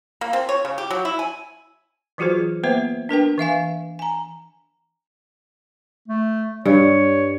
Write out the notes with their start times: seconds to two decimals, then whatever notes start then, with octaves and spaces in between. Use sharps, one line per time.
0.21 A#3
0.33 C4
0.49 C#5
0.65 C#3
0.78 G4
0.91 F#3
1.05 E4
1.19 G#5
2.18 E3 F#3 F4 F#4 G#4 C5
2.64 A#3 B3 B4 C5 E5
3.09 D4 A#4 B4 G5
3.38 E3 E5 F5 G#5
3.99 G#5 A#5
6.08 A3
6.65 G2 C#5